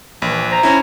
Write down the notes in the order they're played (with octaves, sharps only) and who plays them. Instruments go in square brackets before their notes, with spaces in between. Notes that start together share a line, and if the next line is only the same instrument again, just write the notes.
[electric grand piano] A#1 [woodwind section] E3
[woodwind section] C5 A#5
[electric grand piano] C#4 E4